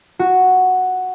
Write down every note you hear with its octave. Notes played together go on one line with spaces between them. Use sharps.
F#4